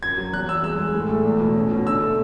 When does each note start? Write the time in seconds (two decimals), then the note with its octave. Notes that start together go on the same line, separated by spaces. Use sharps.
0.03 F#2 G#6
0.18 F#3
0.32 E2 F#6
0.49 E2 E6
0.63 G#3 E6
0.78 G#3
0.94 A2
1.09 A3
1.25 E2
1.40 B2
1.56 C#4
1.71 B2
1.86 D3 E6
2.02 A3